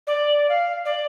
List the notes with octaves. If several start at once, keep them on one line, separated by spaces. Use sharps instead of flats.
D5
F5
D5